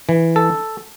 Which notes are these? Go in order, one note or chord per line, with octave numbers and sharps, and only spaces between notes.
E3
A4